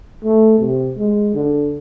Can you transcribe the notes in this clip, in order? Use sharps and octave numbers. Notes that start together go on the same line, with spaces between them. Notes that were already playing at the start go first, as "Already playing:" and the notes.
A3
C3
G#3
D3